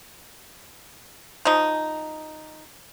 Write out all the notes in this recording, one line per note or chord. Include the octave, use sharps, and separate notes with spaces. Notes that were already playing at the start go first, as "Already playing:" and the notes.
F3 D#4